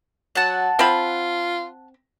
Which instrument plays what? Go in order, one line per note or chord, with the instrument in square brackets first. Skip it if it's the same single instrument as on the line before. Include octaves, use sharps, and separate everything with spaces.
[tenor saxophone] F#3 [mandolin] F#5 A5
[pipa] C4 B5 [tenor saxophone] F4